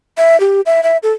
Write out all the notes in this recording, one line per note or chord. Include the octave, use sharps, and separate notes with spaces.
E5
G4
E5
E5
A4